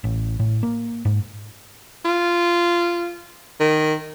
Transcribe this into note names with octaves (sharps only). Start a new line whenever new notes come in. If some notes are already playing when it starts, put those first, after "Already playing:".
A1
A2
A#3
G#2
F4
D#3